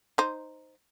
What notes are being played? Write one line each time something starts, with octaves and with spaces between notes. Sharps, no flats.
D#4 C5